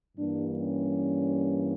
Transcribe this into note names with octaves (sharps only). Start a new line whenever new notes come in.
G2 E3 G3 A#3 D4
C#4